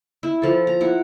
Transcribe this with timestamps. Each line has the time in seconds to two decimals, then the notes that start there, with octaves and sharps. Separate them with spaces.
0.23 E4
0.42 F3 A4
0.67 A#5
0.81 E4 F#5